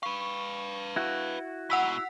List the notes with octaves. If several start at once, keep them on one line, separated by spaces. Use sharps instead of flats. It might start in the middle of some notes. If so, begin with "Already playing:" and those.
B4 F5 C#6
E4 F#4
G#2 B2 F#5 E6 B6